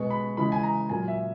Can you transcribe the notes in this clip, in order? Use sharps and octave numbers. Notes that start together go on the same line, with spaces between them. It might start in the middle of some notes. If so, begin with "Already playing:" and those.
Already playing: B2 G#3 B3 C#6
B5
C#3 E3 G#3 B5
G#5
A#5
A#2 F#3 A#3 G#5
E5